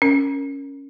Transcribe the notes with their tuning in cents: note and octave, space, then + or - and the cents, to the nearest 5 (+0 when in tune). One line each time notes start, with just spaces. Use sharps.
C#4 +0 A#4 +0